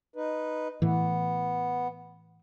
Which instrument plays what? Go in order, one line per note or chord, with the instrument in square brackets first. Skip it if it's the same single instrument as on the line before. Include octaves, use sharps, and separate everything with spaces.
[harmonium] D#4 B4
[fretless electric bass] A2 E3 [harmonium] B3